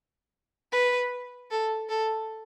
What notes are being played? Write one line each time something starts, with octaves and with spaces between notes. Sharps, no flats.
B4
A4
A4